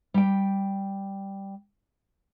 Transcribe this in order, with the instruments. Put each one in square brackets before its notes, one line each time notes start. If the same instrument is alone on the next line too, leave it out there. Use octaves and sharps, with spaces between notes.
[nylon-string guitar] G3 G5